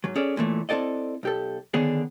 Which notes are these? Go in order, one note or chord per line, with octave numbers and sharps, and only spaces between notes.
G#2 F#3
C#4 G#4 A4 D5
F#2 A#2 E3 A3
C4 E4 A4 D5 D#5
B1 G4 A4
D3 D#3 B3 D4 G#4 C#5